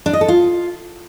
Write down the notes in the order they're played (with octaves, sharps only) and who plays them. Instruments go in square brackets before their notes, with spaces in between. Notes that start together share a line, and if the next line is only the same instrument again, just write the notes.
[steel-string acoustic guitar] D4
D#5
A4
F4